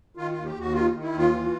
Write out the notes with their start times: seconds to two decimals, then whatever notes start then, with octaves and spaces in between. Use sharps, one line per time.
0.17 D#3 F4
0.31 D#2 F4
0.46 G4
0.55 D#2 F#4
0.74 D#3 F4
0.94 D#3
1.03 E4
1.13 D#2
1.18 F4
1.32 E3